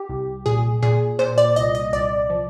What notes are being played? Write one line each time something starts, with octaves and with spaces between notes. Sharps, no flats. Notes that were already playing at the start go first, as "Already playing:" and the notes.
Already playing: G4
C2
A#2 G#4
A#2 G#4
A#2 C5
D5
C2 D#5
D#5
C2 D5
F3